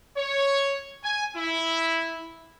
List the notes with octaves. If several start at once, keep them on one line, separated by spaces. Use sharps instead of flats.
C#5
G#5
E4